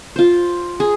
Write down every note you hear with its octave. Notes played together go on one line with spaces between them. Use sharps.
F4 C5
G#4